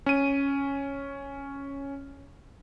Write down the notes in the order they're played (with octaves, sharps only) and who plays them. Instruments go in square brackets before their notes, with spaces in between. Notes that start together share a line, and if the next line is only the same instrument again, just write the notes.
[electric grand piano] C#4 D#7